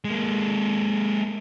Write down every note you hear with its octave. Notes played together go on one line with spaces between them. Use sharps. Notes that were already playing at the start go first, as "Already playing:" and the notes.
G#3 A#3